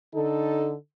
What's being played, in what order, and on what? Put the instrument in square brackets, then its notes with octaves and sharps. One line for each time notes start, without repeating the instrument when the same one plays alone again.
[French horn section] D3 D#4 A4